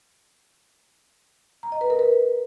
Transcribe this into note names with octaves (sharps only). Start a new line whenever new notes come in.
A#5
D#5
B4
A#4
B4